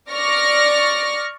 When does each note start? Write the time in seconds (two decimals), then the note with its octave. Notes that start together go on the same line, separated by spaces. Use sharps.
0.11 D5 C#6 F6 A#6